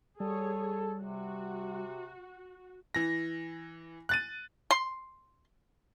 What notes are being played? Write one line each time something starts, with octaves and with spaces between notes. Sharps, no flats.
G3 G#4 A4 C#5
C3 F#4
E3 A#6
F#6 A6 D#7
C6